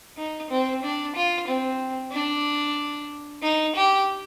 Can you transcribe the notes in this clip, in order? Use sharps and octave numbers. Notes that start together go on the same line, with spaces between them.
D#4
C4
D4
F4
C4
D4
D#4
G4